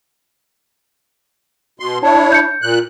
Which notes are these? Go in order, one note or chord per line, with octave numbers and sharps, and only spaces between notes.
B2 C6
D4 E4 C#5 A5
G6 C#7
A#2 F#6